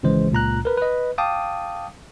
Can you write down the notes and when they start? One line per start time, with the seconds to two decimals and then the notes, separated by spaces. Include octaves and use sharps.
0.03 G#1 C#3 E3 G#3 C5
0.32 C#2 A#2 A#5 F#6
0.65 A#4 B4
0.78 B4 D#5
1.18 F5 G5 A5 D6 D#6